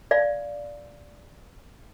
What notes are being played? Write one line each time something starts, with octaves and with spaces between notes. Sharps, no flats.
D5 F5